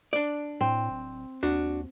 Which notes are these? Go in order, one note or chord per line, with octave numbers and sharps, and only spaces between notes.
D4 D5
A2 C4
D1
D#2 D4 F#4